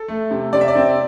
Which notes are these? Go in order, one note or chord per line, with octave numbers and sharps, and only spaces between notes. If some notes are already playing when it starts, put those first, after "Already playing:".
Already playing: A4
A3
C3
C3 D5
E5
D5
C4